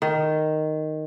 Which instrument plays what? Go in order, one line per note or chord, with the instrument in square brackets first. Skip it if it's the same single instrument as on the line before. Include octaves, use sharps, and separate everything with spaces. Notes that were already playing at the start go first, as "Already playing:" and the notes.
[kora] D#3